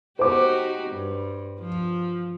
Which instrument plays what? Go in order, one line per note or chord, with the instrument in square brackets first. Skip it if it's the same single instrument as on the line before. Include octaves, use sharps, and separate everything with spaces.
[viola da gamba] D#4 F#4 G4 [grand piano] C5 D6
[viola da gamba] G2
F3